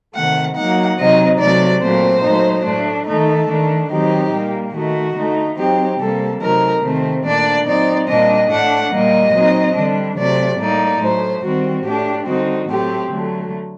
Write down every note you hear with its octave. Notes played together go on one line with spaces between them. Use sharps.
C3 D#3 A3 F#5
F#3 A#3 D#4 F#5
C3 F#3 C4 D#4 D#5
C3 F#3 A3 D5
A#2 F#3 A3 C4 C5
F#3 A3 D#4
A2 A3 D4
D#3 A3 D#4 A4
D#3 A3 D4
D#3 F#3 C4 D#4 G4
A#2 G3 A#3
D#3 A3 D#4 F#4
D3 A3 D#4
F#3 C4 D#4 G4
C3 G3 A#3 A4
C3 F#3 A3 D#4 A#4
C3 D#3 A3 C4 C5
A#2 A3 D4 D5
F#3 C4 D#4 D5
A#2 G3 D4 D#5
A2 A3 D4 F#5
A#2 G3 A#3 D#5
F#3 C4 D#4
D3 G3 D4
C3 F#3 A3 D5
A2 G3 A#3 D#4 D5
A2 F#3 A3 C5
D#3 G3 C4 F#4
A2 A3 D4 G4
D3 G3 C4 D#4 F#4
A2 F#3 A3 C4 G4
D3 F#3 A3